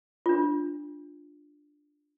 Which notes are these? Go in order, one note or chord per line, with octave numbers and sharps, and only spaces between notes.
D4 F4